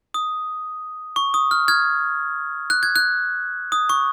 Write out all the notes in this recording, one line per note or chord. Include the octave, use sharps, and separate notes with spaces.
D#6
C#6
D#6
F6
F6 G#6
F#6
G#6
F#6
D#6
C#6